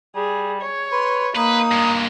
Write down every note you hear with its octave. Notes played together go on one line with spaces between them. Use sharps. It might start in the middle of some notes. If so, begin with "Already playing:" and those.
G3 G#4
C#5
B4 C6
A#3 D#4 B4 D#6
G2 G#3